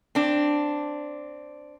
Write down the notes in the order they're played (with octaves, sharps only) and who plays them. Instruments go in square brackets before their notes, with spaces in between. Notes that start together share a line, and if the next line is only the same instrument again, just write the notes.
[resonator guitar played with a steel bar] C4 D4